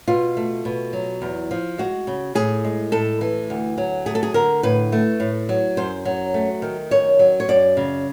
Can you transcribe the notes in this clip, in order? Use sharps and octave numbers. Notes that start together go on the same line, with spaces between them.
B2 F4
A3
B2
F#3
E2
F3
G#3 F#4
C#3
A2 G#4
G#3
A2 A4
E3
D2
F#3
A3 G#4
A4
G#4
D3 A#4
A2 B4
A3
A2
F#3
F#2 C5
F#3
A3
D#3
F#2 C#5
F#3
C#5
F#2 D5
C#3